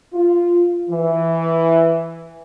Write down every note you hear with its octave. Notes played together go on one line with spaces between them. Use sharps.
F4
E3